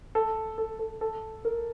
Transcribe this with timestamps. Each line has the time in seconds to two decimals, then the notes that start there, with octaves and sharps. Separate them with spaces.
0.15 A4
0.58 A4
0.79 A4
1.01 A4
1.45 A#4